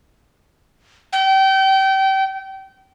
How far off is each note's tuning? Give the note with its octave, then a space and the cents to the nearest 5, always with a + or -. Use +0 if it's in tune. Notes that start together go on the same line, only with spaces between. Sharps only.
G5 -30